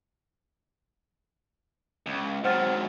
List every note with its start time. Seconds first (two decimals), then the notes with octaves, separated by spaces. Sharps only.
2.06 C#2
2.44 G#2 F#3 C4 F#5 F6 A6